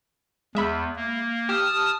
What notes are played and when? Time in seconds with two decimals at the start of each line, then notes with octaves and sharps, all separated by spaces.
0.55 E2 G#3 E5 B5
0.96 A#3
1.49 G4 A5 D#6 F6